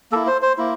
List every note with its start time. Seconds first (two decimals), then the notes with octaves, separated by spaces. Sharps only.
0.12 A#3 E4 A4
0.27 C5
0.42 C5
0.58 A#3 E4